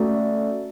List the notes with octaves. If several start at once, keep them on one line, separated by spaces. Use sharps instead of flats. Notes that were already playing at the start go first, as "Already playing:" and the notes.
Already playing: A3 C#4 F#4 A4 D5